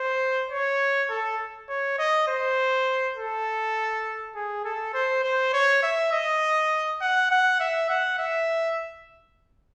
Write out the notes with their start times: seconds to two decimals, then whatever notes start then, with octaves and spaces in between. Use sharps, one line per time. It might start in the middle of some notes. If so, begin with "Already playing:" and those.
Already playing: C5
0.50 C#5
1.10 A4
1.69 C#5
1.99 D#5
2.28 C5
3.16 A4
4.36 G#4
4.65 A4
4.94 C5
5.23 C5
5.53 C#5
5.83 E5
6.12 D#5
7.01 F#5
7.31 F#5
7.60 E5
7.89 F#5
8.19 E5